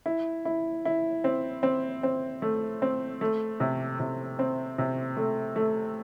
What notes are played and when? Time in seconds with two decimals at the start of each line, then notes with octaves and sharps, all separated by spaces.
0.06 E4
0.45 E4
0.85 E4
1.24 C4
1.63 C4
2.03 C4
2.42 A3
2.82 C4
3.21 A3
3.60 C3
4.00 C3
4.39 C4
4.78 C3
5.17 A3
5.56 A3